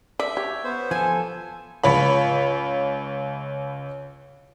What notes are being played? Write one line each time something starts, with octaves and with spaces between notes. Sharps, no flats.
D5 E5
G4 C#5
B3 C5
F3 A4 G#5
C#2 C#5 B5